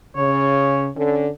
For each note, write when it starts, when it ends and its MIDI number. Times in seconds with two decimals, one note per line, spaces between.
0.16 0.89 49
0.16 0.88 73
0.96 1.28 50
0.96 1.28 61
0.96 1.28 69